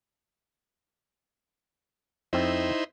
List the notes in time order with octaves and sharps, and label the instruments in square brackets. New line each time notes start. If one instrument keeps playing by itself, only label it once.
[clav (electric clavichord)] F2 C4 [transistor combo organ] D#4 E4 C5